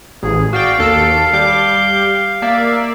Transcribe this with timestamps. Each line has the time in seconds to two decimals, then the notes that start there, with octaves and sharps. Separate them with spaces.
0.23 A1 G#4
0.53 F#4 D5 F5 G5
0.79 D#2 A4 D7
1.33 G3 D6 G6
2.42 A#3 D5 E5